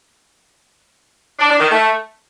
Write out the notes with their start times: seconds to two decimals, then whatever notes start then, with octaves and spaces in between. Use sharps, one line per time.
1.39 D4
1.49 D4
1.60 D#3
1.70 A3